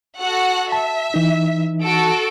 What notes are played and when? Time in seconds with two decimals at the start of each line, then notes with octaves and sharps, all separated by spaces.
0.20 F#4 A4 F#5
0.72 E5 A5
1.14 E3 D#4
1.84 F#4 A4 D7